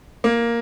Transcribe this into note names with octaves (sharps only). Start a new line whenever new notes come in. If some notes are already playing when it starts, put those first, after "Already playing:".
A#3